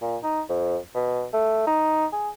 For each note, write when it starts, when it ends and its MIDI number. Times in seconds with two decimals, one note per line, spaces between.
0.01 0.17 46
0.23 0.42 63
0.49 0.78 41
0.95 1.26 47
1.33 1.67 57
1.67 2.06 63
2.12 2.29 68